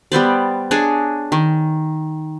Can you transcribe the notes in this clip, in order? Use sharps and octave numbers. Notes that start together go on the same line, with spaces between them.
G3 B3 C5 D5
D4 G#4 C#5 D#5
D#3